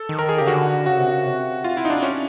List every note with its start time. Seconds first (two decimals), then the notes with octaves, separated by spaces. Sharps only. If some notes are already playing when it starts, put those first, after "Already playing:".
Already playing: A4
0.09 D#3
0.19 A#4
0.29 G#4
0.38 C#3 G4
0.47 D3 F#4
0.86 C#3 F#4
0.99 C3
1.10 C#3
1.26 C3
1.64 F4
1.77 E4
1.85 D#4
1.90 D4
2.03 C#4